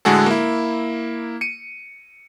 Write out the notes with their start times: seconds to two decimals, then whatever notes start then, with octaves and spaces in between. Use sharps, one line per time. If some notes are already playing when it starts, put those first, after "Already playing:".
0.05 A2 D3 G#3 F#4 G#4 A4
0.26 A#3 E4
1.41 C#7 D#7